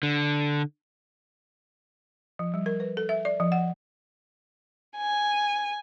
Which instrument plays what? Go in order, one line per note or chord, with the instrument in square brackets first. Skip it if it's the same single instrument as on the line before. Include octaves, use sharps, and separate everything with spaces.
[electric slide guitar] D3
[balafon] F3
G3
A#4
B4
A4
E5
D5
F3
F#5
[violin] G#5